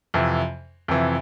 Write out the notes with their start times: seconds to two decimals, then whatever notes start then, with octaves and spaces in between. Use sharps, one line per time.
0.14 F2 C3 E3
0.88 F2 C3 E3